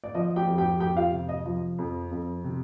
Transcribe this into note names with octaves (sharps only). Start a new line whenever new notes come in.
D5
F3 D#5
G4 G5
F2
G4 G5
F2 G4 G5
F4 F5
C3
D#5
F3
F2
F2
C3